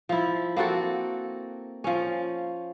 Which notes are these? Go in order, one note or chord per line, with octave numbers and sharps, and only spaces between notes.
F3 E4
A#3 C4 F#4 A4
F3 C#4